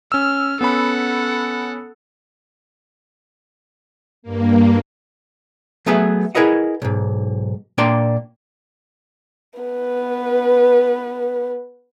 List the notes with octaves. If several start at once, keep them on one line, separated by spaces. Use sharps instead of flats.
C#4 E6 F6
B3 C#4 A4 F#5 B5
G2 A#3
F#3 A3 B3 G#4 B4 E5
E4 G#4 A#4 B4 D#5 F#5
B1 G#2
A#2 A#3 D4 D5 G5 C6
B3 B4